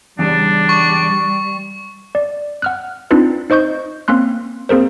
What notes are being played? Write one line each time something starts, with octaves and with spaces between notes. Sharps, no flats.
E2 C#3 G3 D4
C#6
D5
F#5 F6 F#6
C4 D4 D#4 F4 B4
D#4 C5 D#5 C#6 G6
A#3 C4 C#4 C6 F#6
A#3 C4 G#4 A#4 C5